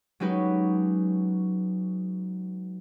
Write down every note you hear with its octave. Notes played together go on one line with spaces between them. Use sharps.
F#3 G#3 C#4 D#4 G4 B4